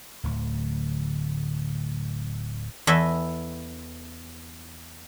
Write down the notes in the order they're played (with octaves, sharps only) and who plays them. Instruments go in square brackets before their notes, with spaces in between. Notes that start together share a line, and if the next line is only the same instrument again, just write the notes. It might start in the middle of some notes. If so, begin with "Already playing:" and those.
[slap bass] D1 D2
[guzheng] E2 E4 A4 D#5 E5 G#5